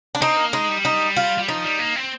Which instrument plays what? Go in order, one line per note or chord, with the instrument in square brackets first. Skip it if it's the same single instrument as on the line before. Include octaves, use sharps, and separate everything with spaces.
[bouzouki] D4
[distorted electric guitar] C4 [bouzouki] D#4
[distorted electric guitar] A#3
[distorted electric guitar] G#3 [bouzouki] D#4
[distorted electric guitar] G3
[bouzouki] D#4
F4
[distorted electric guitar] G3
[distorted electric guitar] F3 [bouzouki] D#4
[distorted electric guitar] G3
A#3
C4